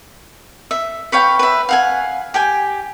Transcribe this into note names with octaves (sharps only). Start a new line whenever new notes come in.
E5
B4 C#5 F5 G5
B4 E5
F5 F#5 G#5
G4 G5 G#5